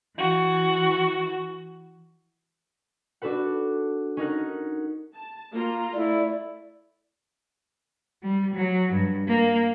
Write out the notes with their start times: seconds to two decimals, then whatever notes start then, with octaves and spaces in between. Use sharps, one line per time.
0.18 E3 F#4
3.22 D4 F#4 A4 B4 F#5
4.17 C#4 D#4 A#4 F#5
5.15 A5
5.53 A#3 F4 A#5
5.93 A3 E4 D5
8.23 G3
8.55 F#3
8.93 G2
9.28 A#3